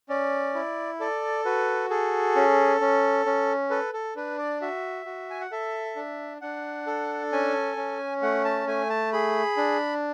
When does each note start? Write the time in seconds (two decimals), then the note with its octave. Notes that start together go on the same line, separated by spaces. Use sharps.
0.09 C#4 D5
0.55 E4
1.00 A4 D5
1.45 F#4 B4
1.90 G#4 A4
2.36 C#4
2.81 C#4
3.26 C#4
3.70 A4 B4
3.93 A4
4.16 D4 B4
4.38 D5
4.61 F#4 E5
5.06 F#4
5.30 G#5
5.41 F#5
5.52 A4 E5
5.96 D4
6.41 D4 F#5
6.87 A4
7.32 C#4 G#5
7.76 C#4
8.22 A3 F#5
8.45 A5
8.67 A3 G#5
8.90 A5
9.13 G#4 B5
9.57 D4